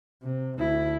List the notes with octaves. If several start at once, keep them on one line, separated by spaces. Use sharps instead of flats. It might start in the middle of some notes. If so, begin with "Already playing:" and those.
C3
D2 E4